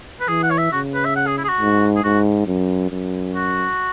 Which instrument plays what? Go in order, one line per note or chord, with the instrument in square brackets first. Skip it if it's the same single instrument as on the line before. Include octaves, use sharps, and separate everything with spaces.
[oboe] B4
[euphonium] E3 [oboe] G#4
[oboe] F#5
C#5
E5
[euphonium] C#3 [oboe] F#4
[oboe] B4
E5
F#5
G#4
E4
G#4
F#4
[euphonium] G#2
[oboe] G#4
[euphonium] G#2 [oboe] F#4
[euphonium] F#2
F#2
[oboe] F#4